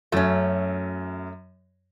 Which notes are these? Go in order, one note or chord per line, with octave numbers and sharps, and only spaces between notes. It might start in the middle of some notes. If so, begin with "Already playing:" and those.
F#2 F#3 A3 C#4